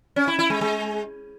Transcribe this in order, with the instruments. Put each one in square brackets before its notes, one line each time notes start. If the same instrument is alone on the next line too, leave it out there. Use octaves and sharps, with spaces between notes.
[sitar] C#4
E4
E4
G#3
G#3